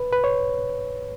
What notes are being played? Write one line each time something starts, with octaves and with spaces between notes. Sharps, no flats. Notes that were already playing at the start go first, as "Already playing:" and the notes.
Already playing: B4
B4
C#5